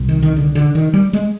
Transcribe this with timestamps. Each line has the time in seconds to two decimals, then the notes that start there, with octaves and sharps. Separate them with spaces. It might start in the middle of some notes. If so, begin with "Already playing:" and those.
Already playing: C2 C3
0.09 D#3
0.22 D#3
0.36 D3
0.55 D3
0.75 D#3
0.93 G3
1.13 G#3